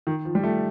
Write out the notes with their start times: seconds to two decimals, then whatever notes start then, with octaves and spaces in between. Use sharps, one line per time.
0.07 D#3
0.25 F3
0.35 G3
0.43 A3